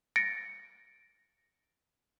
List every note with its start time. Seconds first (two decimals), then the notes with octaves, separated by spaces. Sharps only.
0.16 A6 A#6 C#7 D7